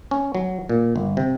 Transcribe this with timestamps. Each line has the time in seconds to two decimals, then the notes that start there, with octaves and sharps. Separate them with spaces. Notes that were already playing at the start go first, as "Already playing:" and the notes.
0.11 C#4
0.35 F#3
0.69 A#2
0.96 G1
1.17 C3